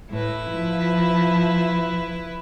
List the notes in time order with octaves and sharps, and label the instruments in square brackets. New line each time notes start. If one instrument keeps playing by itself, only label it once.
[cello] A2 [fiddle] E4 B4
[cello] F3